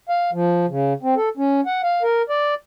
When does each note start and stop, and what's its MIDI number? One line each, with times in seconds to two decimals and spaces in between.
0.09 0.31 77
0.33 0.66 53
0.69 0.93 49
1.03 1.15 60
1.16 1.29 69
1.37 1.61 61
1.66 1.81 78
1.83 2.02 77
2.02 2.22 70
2.29 2.54 74